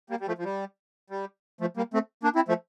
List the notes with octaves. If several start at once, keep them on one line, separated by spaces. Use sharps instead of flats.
G3 A#3
G3
F3 A3
F3
G3
G3
F3 A3
G3 A#3
A3 C4
A#3 D4
C4 E4
F3 A3